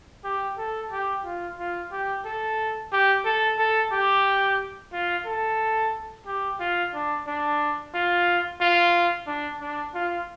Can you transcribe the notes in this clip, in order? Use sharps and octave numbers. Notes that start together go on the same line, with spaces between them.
G4
A4
G4
F4
F4
G4
A4
G4
A4
A4
G4
F4
A4
G4
F4
D4
D4
F4
F4
D4
D4
F4